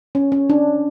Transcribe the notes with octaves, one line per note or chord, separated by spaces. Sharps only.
C#4
C#4
D4